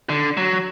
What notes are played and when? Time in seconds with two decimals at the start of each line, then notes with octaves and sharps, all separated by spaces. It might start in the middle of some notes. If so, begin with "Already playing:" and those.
0.09 D3
0.37 F#3